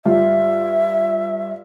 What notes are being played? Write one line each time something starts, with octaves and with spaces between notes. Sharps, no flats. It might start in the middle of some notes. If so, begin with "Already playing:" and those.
G2 F4 G4 E5